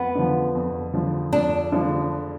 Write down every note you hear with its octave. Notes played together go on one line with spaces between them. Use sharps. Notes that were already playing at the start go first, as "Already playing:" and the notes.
Already playing: F2 B3
D3 F3
F2
D3 F3
F2 D4
D3 F3